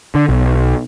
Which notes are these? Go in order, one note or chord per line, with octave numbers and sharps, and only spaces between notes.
D3
B1